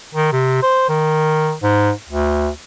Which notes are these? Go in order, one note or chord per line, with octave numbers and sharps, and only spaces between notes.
D#3
C3
C5
D#3
G#2
D2